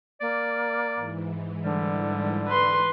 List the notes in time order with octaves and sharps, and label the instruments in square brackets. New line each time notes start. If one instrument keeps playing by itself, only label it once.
[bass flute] A#3 [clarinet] D5
[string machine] G#2 E3
[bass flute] D3 [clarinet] G3
[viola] B4 C6